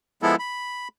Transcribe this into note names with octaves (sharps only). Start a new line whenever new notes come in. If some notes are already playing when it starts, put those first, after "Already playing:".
F3 G#3 B3 E4 A4
B5